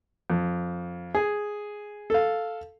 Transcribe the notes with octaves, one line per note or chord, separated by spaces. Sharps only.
F2
G#4
A4 F5